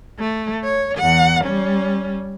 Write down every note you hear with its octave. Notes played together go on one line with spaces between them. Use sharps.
A3
C#5
E2 F#5
G3 C#4